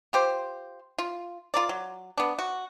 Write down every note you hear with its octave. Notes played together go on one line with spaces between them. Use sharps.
F4 G4 C5
F4
F4 A#4 D5
F#3
B3 D4
F#4